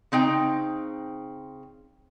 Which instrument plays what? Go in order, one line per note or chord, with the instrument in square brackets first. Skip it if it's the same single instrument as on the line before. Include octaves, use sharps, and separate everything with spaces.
[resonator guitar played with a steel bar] C#3 C4 D#4 G5